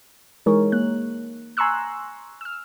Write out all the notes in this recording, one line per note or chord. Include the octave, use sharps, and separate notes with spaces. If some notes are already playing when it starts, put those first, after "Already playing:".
E3 G#3 D#4 G#4 A#4 C#5
A#3 F#6
G#5 A#5 C6 C#6 E6 F#6
E6 F6